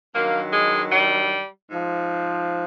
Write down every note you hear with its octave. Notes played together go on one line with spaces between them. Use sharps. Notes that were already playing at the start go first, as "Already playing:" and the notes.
G2 D#3 F#3 A#3
G#3
G3
G#2 F3